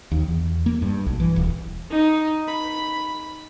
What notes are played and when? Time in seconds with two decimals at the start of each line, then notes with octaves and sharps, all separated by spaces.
0.11 D#2
0.28 E2
0.66 A#3
0.82 G2
1.06 B1
1.20 E3
1.36 D#1
1.90 D#4
2.48 B5